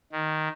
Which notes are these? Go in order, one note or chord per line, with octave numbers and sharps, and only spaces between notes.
D#3